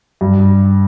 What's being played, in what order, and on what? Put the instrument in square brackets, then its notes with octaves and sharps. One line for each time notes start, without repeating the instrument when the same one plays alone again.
[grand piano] G2